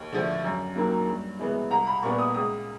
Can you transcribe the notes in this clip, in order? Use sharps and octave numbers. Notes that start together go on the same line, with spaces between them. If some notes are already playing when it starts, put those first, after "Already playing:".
Already playing: D#2
D3 F3 A3
F#2
D#3 F#3 A#3
G2
E3 G#3 B3
C2 A#5
B5
A#2 G3 B3 C#6
D#6
C#2 D#6